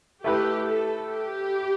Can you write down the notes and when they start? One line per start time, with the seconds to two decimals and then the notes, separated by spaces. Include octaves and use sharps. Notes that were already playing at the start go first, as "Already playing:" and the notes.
0.24 A3 E4 G4 B4
0.66 A4
1.08 G4